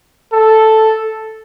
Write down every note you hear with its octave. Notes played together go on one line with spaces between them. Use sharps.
A4